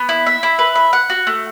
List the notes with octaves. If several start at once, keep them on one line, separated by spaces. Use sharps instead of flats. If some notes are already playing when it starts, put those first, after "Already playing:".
Already playing: B3
E4
E5
E4
B4
E5
F#5
F#4
A3